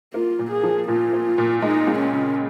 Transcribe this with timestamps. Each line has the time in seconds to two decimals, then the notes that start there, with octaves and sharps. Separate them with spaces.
0.14 A#3 F4
0.39 A#2
0.52 G#4
0.63 F3
0.88 A#2 F4
1.13 A#3
1.38 A#2
1.62 G#3 D#4
1.87 C#2
1.99 C#4
2.12 C#3